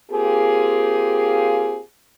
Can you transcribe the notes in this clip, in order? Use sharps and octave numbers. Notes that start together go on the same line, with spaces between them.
A#3 C4 F4 G4 G#4